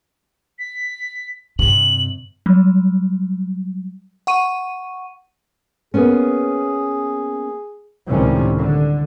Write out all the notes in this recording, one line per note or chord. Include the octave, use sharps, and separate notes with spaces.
B6
G2 C3 F#7
F#3 G3
F#5 C#6 D#7
A#3 B3 C#4 G#4
C#2 A2 C3 D#3 G3 C#4
D3